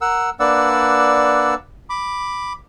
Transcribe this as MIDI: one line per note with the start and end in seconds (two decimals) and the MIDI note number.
0.01 0.30 70
0.01 0.30 78
0.01 0.30 88
0.40 1.54 58
0.40 1.54 62
0.40 1.54 71
0.40 1.54 74
0.40 1.54 78
0.40 1.54 88
1.90 2.53 83
1.90 2.53 86